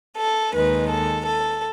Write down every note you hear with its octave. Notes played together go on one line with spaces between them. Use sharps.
A4
D#2 D#3 G#3 B4
A4
A4